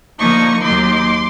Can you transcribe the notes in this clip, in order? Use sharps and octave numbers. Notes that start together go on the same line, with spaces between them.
D3 F3 A#3 D#4 C#6 D#6
D#2 D#3 F#3 A#3 D#4 C6 D6